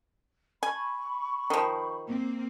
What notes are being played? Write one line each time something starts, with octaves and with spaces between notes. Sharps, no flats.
G#5 B5 C#6
D#3 F3
A#3 C4